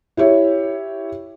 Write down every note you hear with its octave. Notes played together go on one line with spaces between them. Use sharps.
E4 G4 C#5 E5